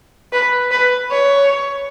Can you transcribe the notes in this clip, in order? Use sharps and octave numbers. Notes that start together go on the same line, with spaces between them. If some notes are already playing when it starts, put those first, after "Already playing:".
B4
B4
C#5